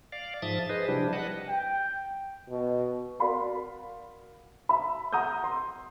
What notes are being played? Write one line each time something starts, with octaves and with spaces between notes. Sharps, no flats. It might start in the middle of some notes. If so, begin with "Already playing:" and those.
D5 F5
G#2 F3 E5 D#6 A6
G#4 B4 C5 D#5
C3 F3 G3 D4 E4 G4
G3 B4 D#5 F#5 A5
G5
B2
F#4 A#4 D5 F5 B5 C6
E5 B5
F#5 A#5 D#6 E6 G6
C6